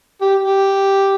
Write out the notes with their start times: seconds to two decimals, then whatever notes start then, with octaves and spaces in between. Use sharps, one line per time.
0.21 G4
0.43 G4